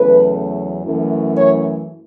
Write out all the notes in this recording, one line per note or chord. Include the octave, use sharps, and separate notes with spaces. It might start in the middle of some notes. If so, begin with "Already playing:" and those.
Already playing: E2 C#3 F#3 A3 B4
F#2 E3 A3
C#5